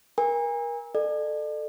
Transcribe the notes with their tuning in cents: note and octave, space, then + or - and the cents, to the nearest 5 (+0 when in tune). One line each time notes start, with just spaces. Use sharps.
A#4 +30 G#5 -35
A4 +0 D5 +45